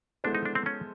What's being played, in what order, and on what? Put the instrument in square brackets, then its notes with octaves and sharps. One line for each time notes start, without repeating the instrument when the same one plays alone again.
[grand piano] G#3 B3 E4 A4 C5 [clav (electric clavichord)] D4
[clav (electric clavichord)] D#4
D4
C4
C#4